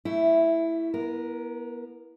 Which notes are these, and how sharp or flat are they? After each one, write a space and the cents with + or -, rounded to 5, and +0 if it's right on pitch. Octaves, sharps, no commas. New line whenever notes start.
A3 +20 E4 +0
B3 -30 A#4 +0